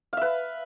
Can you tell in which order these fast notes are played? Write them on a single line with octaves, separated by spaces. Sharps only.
F5 E5 B4